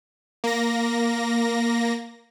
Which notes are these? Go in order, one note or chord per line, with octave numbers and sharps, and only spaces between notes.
A#3 A#6